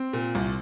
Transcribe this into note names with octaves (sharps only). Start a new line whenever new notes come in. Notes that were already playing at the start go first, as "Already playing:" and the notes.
Already playing: C4
A#2
C2